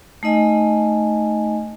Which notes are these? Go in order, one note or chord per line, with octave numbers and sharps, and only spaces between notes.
A3 D#4 D#5 G#5